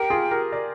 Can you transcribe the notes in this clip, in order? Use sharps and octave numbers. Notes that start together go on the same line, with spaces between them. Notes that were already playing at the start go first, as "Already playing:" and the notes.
Already playing: G4 A#4 G5
F4 G#4
G4 A#4
A#4 D5